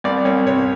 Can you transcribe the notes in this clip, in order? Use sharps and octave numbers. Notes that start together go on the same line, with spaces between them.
C2 D5
C2 C#5
C3 C#5